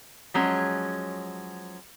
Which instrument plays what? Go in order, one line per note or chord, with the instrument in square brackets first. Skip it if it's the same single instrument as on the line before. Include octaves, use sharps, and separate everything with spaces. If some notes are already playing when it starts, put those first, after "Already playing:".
[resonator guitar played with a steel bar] F3 F#3 G#3 C#4